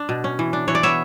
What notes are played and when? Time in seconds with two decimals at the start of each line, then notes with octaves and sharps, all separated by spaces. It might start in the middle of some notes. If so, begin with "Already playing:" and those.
Already playing: D4
0.09 B2
0.24 C#4
0.39 E3
0.53 D4
0.68 E3 C#5
0.75 D5
0.83 B3 C#5 E5